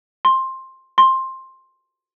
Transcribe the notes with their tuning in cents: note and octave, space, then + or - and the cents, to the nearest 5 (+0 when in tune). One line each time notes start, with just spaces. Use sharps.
C6 +10
C6 +10